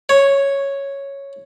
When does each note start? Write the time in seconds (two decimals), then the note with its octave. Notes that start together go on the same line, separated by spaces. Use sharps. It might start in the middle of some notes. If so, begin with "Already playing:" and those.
0.09 C#5